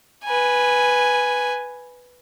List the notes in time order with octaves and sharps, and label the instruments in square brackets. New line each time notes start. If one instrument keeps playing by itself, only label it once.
[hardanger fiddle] B4 G#5